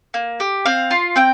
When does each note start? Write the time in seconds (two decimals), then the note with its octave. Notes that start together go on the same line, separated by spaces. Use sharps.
0.14 A#3
0.40 G4
0.65 C4 F5
0.91 F4
1.16 C4 G5